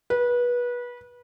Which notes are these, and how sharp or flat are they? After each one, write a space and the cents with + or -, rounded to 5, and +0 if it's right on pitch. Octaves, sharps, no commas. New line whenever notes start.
B4 -25